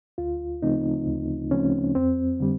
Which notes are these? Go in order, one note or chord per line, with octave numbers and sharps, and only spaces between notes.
D2 F4
C#3 F3 A3 C4 D#4
D2
C#3 F3 A3 C4 C#4
F2 C4
D3 G3